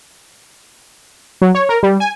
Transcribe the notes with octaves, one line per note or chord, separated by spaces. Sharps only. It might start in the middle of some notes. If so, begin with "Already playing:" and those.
F#3
C#5
A#4
G3
G#5